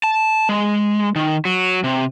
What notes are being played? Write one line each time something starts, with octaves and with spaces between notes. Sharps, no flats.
A5
G#3
D#3
F#3
C3